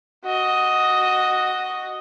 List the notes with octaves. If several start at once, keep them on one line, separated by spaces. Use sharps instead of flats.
F#4 D#5